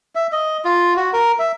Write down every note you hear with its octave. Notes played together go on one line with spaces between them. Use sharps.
E5
D#5
F4
F#4
A#4
E5